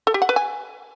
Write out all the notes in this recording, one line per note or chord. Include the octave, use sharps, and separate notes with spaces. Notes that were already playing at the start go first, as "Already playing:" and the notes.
A4
G4
F#5
B4
G#5